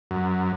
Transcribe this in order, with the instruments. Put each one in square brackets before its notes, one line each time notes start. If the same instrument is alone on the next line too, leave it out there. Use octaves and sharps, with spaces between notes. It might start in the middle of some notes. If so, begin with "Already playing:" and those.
[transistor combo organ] F#2